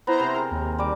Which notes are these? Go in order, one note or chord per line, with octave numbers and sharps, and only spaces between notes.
B3 E4 C5 A#5
C3
G#4 A#4
D#2
G3 D6